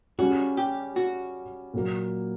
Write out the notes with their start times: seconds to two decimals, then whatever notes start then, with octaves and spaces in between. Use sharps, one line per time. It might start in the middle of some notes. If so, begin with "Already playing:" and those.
0.19 C#3 G3 C#4 F#4
0.57 G4
0.96 F#4
1.74 A#2 F#3 A#3